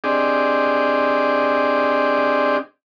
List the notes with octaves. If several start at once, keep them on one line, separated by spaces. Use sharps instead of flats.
C4 D4 G4 G#4 D5 D#5